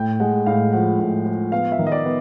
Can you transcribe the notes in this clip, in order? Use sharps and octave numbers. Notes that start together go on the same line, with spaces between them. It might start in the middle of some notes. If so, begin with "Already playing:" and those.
Already playing: A2 G5
G#3 F#5
A2 F5
F3 F#5
A2
F3
B3 F5
E5
D#3
D#5
D5
B3